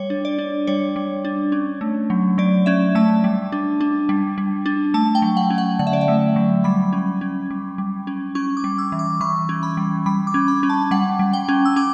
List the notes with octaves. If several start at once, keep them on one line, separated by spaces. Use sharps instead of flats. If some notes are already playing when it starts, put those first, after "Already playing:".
Already playing: G3 C#5
D4
D5
D4
G3 C#5
G3
D4
C#4
A3
F#3
F#3 D5
C#4 E5
A3 A5
G3
D4
D4
G3
G3
D4
A3 A5
G5
F#3
F#5
C#4
F#5
D3 F#5
E5
D5
E5
A3
F#3
G3 B5
C#4
C#4
G3
G3
C#4
C#4 C#6
D6
G3
E6
E3
D6
E3 C#6
C#4
B5
G3
G3 B5
D6
C#4
B5
C#4
A5
G3 F#5
G3
G5
C#4
E6
C#4 D6